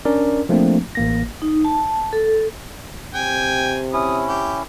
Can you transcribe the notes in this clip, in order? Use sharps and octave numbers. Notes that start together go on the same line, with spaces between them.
C#4 D4 A#4 D5
F3 A3 A#3 C4 D4
A1 A#3 A#6
D#4
A5
A4
C3 G5 G#5
C#4 E4 D#6
G4